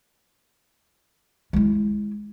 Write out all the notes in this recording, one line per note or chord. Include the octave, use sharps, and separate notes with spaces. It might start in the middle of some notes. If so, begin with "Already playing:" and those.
G#3 E4